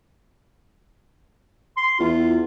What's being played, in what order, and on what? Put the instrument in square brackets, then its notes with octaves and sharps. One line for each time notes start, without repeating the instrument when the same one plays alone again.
[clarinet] C6
[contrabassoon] E2 [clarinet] F4